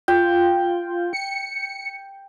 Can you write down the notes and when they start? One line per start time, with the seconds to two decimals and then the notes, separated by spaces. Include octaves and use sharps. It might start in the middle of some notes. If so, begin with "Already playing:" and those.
0.08 F4 G5
1.13 C#7